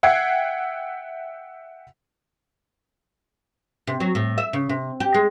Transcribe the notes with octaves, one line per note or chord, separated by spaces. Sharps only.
E5 F#5 G5 G#6 C7
C3
F#3
A2
E5
C#3
C3
G4
G#3